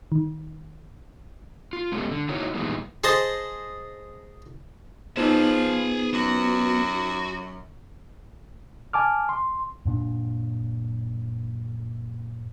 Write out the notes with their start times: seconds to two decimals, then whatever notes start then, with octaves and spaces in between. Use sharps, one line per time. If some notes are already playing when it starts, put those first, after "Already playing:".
0.12 D#3
1.73 F4
1.92 G#3 B3 C#4 F#4 G4 A4
2.11 D3
2.29 D#4 E4 F#4 A#4 C#5
2.55 A#2 D#3 E3 G3 G#3 B3
3.04 G#4 C5 D#5 A5
5.17 F3 B3 D#4 F4 G#4 C5 A5
6.13 F#2 F#4
8.93 G#5 A5 D6 F6
9.29 C6
9.85 F#2 A#2 D4